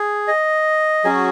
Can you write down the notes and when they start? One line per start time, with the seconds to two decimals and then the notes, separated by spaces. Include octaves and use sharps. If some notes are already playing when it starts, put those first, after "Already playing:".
Already playing: G#4
0.28 D#5
1.04 F#3 C#4 F#4 G#4